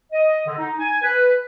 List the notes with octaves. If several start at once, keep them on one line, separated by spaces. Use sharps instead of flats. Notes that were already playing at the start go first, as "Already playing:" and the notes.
D#5
D3
D#4
G#5
B4